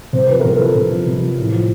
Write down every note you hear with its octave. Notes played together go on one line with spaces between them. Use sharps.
C3 C5
F3 B4
C3 A#4
F3 A4 B4
C3
F3
C3
F3
A2
F3